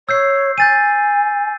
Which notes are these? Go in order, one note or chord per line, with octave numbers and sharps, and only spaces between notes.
C#5 E6 G6 C7
G#5 G6 A6 D#7